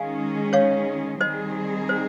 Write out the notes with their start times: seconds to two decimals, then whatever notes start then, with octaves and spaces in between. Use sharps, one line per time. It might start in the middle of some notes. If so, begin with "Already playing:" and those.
Already playing: D#3 G#3 C#4 G#4 F5 G#5
0.53 C#5 F5
1.21 D#3 G3 C4 D#4 G#4 C5 D#5
1.89 C5